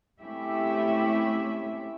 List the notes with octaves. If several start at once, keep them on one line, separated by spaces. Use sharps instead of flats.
A3 C4 C#4 E4 G4 E5